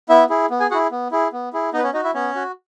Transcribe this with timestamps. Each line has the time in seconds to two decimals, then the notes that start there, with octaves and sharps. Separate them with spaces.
0.09 B3 E4 E5
0.29 E4 G#4
0.50 B3
0.60 G#4 G#5
0.71 F#4 G#4 F#5
0.74 E4
0.92 B3
1.11 E4 G#4
1.33 B3
1.53 E4 G#4
1.73 B3 D#4 D#5
1.78 B4
1.84 C#4 C#5
1.94 D#4 F#4 D#5
2.04 E4 E5
2.14 B3 C#4 C#5
2.35 F#4